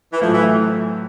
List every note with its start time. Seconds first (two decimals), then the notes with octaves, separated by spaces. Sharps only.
0.13 E3
0.21 A2 F3 F#3 A3
0.34 E3